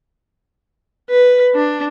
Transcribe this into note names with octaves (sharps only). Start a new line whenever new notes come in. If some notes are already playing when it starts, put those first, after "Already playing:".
B4
D4